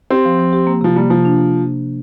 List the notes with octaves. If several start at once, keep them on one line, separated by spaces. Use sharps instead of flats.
C4 G4
F3
F3
G4
A#3
C3 F3
G3 A#3
C3 F3
D4